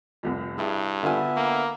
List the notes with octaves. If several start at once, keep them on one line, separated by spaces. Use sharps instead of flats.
F1 C2 F2
G2 E4 G#4
D3 B3 F4 E5 G#5
A#3